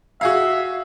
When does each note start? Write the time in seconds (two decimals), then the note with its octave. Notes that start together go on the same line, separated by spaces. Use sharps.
0.21 F#4 G#4 E5 F5